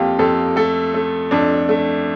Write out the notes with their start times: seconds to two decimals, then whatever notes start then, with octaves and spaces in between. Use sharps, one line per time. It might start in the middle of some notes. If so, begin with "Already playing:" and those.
Already playing: F2 A#3 F4 G4
0.19 F2 A4
0.56 A3 A4
0.94 A3
1.31 F2 D4
1.69 A3